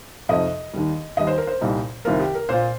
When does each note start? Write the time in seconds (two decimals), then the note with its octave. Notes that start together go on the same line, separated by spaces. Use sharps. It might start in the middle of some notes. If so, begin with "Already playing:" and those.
0.29 F2 C3 F3 D#4 D#5
0.73 D#2 D#3 G3
1.17 D#2 D#3 G3 D#5
1.27 C5
1.38 A#4
1.47 C5
1.61 C2 A#2 G3 D#4
2.05 C2 C3 D#3 C4 F4 A#4
2.20 G4
2.35 A#4
2.49 A#2 A#3 F4 C5